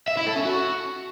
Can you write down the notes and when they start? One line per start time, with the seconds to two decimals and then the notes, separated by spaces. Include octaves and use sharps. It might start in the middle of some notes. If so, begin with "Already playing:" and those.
0.08 E5
0.17 E4
0.27 A4
0.36 C#4
0.45 F#4